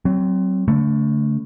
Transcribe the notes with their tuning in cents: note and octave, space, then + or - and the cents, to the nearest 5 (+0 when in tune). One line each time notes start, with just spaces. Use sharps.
F#3 +25 C4 +0
D3 -40 A3 +0